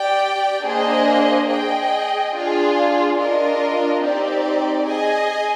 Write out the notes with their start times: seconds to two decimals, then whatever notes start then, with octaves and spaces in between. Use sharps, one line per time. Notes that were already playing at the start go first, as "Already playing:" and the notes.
Already playing: G4 D5 G5
0.63 A#3 D4 G#4 C5 D#5
1.47 G#4 D#5 G5
2.33 D4 F4 G#4
3.17 D4 F4 A#4 D#5
4.02 C4 D#4 G4 D5
4.87 G#4 D#5 G#5